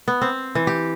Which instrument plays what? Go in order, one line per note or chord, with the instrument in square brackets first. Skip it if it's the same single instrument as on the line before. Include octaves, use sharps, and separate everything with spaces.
[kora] B3
C4
E3
G4